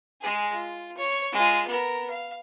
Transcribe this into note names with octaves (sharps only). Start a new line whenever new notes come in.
G#3 G#4
F4
C#5
G#3 F4
B3 A#4
F5